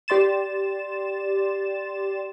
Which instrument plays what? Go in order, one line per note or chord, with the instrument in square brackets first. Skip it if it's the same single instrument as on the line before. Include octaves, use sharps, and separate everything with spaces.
[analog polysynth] G4 D5 C6 A6 E7